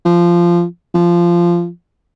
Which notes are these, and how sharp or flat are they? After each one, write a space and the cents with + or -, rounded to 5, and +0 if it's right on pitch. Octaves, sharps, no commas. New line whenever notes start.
F3 -15
F3 -15